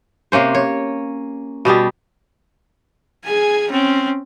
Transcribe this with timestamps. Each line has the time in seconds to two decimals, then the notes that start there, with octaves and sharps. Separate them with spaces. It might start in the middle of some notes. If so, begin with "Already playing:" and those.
0.32 C3 A#3 C#4 C5
0.55 C#5
1.65 B2 G3 G4 G#4
3.26 G#4 G#5
3.71 C4 C#4